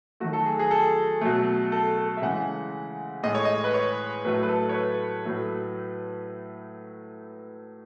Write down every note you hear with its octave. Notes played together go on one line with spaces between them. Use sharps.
D#3 F#3 A3 F#4
A4
G#4
G#4
A4
B2 F#3 A3
A4
A4
E5
C#3 E3 G#3 F#5
A2 G#3 D#5
C#5
D#5
B4
C#5
A2 F#3 A3 B4
B4
A4
C#5
B4
A2 F#3 A3